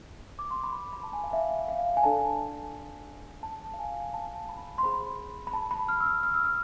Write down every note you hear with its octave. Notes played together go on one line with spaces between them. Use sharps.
D6
C6
B5
B5
A5
G#5
F5
E5
F5
G#5
D4 A4 D5 A5
A5
F5
G#5
A5
B5
C6
G#4 C5 B5
B5
A5
B5
F6
E6
F6
F6
E6
F6